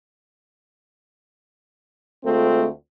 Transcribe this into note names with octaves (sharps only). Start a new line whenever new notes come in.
D2 G#3 A3 C4 F4